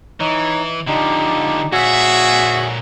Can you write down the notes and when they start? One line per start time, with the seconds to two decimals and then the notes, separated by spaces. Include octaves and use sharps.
0.20 E3 D#4 C#5
0.88 D3 F3 D4 D#4 G4
1.73 A#2 F#4 G#4 C#5 E5 G#5